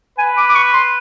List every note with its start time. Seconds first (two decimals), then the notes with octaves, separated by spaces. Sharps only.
0.18 B4 G#5
0.37 D6
0.49 D6
0.55 C#6
0.74 C6